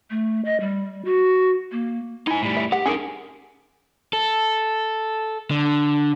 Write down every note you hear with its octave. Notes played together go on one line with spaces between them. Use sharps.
A3
D#5
G3
F#4
A#3
D#4 E4 G#5
A2 G3
E5
G4 F#5
D3 D#3 C#4 G#4 A#4
A4
D3